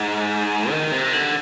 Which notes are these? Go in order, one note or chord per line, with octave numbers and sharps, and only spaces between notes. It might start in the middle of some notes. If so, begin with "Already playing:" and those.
Already playing: G#2
D#3
C3
D3